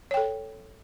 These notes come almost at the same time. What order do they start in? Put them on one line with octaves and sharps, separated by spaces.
C#5 G5 A4